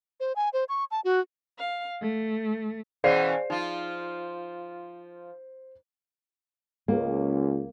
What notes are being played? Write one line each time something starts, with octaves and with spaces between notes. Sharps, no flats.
C5
G#5
C5
C#6
A5
F#4
F5
A3
B2 E3 C#4 G#4 C5 D5 F5 C7
F3 D#4 F4
C#2 A#3